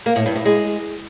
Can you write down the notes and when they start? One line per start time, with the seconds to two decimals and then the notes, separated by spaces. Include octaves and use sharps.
0.06 A#3
0.16 A2
0.26 G2
0.36 A2
0.45 G#3